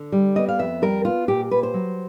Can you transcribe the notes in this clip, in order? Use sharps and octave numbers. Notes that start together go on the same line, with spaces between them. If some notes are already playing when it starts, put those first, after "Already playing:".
Already playing: D3
G3
B3 D#5
F5
F2 E5
G3 A#4
B3 F4
A#2 G4
A#2 B4
C5
F#3